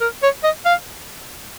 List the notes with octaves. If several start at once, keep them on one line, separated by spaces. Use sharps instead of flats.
A#4
C#5
D#5
F5